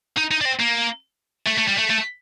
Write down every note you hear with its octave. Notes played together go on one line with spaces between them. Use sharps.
D#4
D#4
D4
C4
A#3
A3
A3
G3
A3
A3